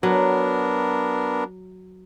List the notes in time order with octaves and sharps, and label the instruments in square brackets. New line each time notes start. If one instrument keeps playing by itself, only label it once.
[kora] F#3 [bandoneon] B3 D4 A#4